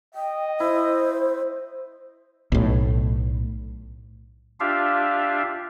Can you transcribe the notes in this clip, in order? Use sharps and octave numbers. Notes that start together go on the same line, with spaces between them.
D#5 G5
E4 C5
B1 A2
D4 F4 G4 E5 F5